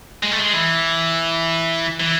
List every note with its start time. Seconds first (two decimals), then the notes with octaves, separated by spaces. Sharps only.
0.23 G#3
0.32 A3
0.39 G#3
0.53 E3
2.00 E3